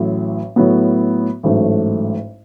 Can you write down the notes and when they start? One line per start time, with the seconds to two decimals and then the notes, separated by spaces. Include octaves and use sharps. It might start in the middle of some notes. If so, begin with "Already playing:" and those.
Already playing: A1 A2 F#3
0.56 A2 F#3 B3
1.43 A1 G#2 F#3 A3